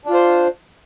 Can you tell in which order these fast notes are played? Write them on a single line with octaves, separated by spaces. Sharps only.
D4 F4 C5